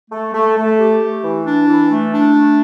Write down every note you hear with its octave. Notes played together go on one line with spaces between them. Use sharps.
A3
A3
A3
G4
A3
E3
D4
E3
A3
D4
A3